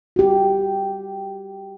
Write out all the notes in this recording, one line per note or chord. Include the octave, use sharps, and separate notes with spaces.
F#4 G4